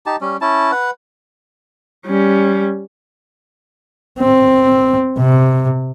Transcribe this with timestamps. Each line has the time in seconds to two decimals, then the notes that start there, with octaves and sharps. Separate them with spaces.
0.06 D#4 G4 A5
0.21 G3 C#4
0.41 C#4 E4 A5
0.72 B4 F#5
2.07 G3 C#4
4.20 C4
5.19 C3